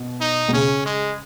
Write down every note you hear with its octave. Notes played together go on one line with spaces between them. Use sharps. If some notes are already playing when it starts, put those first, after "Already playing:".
Already playing: B2
D#4
B2
C#3 C#4
G#3